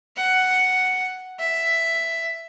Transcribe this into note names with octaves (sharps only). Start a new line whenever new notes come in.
F#5
E5